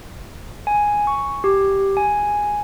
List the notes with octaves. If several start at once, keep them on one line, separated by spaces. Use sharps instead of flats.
G#5
C#6
G4
G#5